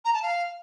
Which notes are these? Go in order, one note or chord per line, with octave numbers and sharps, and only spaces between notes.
A#5
A5
F5